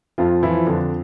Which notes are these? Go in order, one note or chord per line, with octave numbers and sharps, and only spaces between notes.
F2 F3 F4
E3 F3 E4
F2 D3 D4